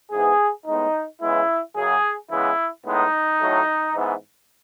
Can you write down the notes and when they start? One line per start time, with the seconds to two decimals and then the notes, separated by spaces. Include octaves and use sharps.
0.12 G#2 E3 B3 G#4
0.66 A2 G#3 B3 D#4
1.21 C#3 E3 G#3 B3 E4
1.76 F#2 C#3 F#3 G#4
2.30 C#3 E3 G#3 B3 E4
2.85 A2 G#3 B3 D#4
3.40 A2 F#3 A3
3.94 G#2 E3 B3